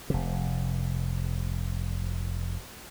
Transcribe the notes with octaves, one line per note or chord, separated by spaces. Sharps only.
F1 C3